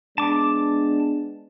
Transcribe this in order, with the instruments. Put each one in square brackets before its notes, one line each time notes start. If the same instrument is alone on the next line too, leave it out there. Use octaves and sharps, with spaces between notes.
[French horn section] G#3 B3 D4 [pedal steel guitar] A5 D6